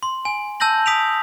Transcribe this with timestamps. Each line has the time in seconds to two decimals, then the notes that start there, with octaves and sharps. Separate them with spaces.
0.03 C6
0.25 G#5
0.60 A5 E6 G6 A#6 F#7
0.86 D#6 B6 D7 F7